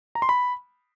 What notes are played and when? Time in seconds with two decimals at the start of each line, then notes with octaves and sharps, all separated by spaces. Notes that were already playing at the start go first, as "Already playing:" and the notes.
0.15 A#5
0.22 C6
0.29 B5